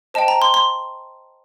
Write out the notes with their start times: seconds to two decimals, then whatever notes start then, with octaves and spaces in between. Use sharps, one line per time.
0.14 C5 D#5 G5 A5
0.28 A#5
0.42 C6
0.54 C6